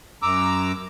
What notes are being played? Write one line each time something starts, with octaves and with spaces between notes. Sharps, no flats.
F#2 A#5 D6 E6